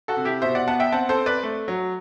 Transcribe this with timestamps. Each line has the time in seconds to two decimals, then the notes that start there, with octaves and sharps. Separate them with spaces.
0.08 F#4 A4
0.17 C3
0.25 E4 G4
0.42 B2 C5 E5
0.55 D5 F#5
0.68 B3 F#5 A5
0.80 E5 G5
0.92 C4 F#5 A5
1.09 A4 C5
1.17 C4
1.26 B4 D5
1.43 A3
1.68 F#3